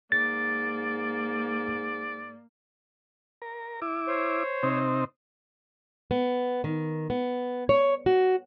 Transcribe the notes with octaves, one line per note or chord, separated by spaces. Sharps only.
G#2 A#3 D5 A6
A#4
E4 D6
C5 C#5
C3 C4 D#4
B3
D#3
B3
C#5
F#4